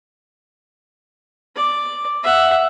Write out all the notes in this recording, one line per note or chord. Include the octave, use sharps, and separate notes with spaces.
D5
E5 F#5